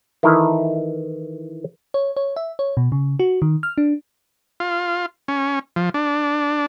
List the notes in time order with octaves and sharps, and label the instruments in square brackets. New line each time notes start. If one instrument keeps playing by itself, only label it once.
[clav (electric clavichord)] D#3 E3 D#4 E4 A4 A#4
[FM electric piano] C#5
C#5
E5
C#5
B2
C#3
F#4
D#3
F6
D4
[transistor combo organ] F4
C#4
F3
D4